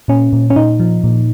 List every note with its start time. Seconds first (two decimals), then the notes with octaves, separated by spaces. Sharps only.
0.08 A#2 C#4
0.33 A#2
0.50 C#4
0.56 A#2 D#4
0.80 F3
1.04 A#2